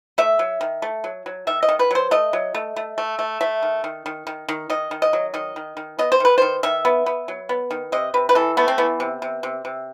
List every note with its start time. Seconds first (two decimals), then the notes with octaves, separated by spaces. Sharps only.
0.18 A3 E5
0.39 F#3
0.61 D#3
0.82 A3
1.04 F#3
1.26 F#3
1.47 D#3 E5
1.63 D#5
1.69 D#3
1.79 B4
1.91 F#3 C5
2.11 A3 D#5
2.33 F#3
2.55 A3
2.76 A3
2.98 A3
3.19 A3
3.41 A3 E5
3.63 D#3
3.84 D#3
4.06 D#3
4.27 D#3
4.49 D#3
4.70 D#3 D#5
4.91 D#3
5.02 D#5
5.13 F#3
5.34 D#3 D#5
5.56 D#3
5.77 D#3
5.99 B3 D#5
6.12 C5
6.20 D#3 B4
6.38 D#3 C5
6.63 D#3 E5
6.85 B3
7.06 B3
7.28 F#3
7.49 B3
7.71 D#3
7.92 C3 D#5
8.14 C3 B4
8.29 B4
8.35 E3 A4
8.57 A3 B3
8.68 C4
8.78 E3 B3
9.00 C3
9.22 C3
9.43 C3
9.65 C3